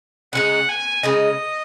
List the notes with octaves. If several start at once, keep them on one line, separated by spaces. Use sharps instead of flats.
C#3 G#3 D#4 F#5
G#5
C#3 G#3 D#4 D#5